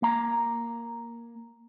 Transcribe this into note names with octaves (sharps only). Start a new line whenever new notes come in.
A#3 A#5